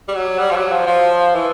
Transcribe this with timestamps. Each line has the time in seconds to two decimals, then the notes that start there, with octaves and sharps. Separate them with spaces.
0.08 G3
0.16 F#3
0.39 G3
0.51 F3
0.56 F#3
0.72 F3
0.87 F3
1.35 E3